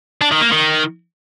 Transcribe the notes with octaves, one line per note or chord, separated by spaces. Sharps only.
D4
D#3
A#3
D#3